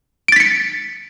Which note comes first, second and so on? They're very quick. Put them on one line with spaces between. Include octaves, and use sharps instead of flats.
D7 A6 B6 C#7